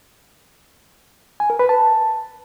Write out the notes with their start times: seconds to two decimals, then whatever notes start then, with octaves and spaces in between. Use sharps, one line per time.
1.40 G#5
1.50 A#4
1.59 B4
1.69 A5